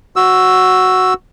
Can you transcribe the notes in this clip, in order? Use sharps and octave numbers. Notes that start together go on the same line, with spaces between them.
F#4 E6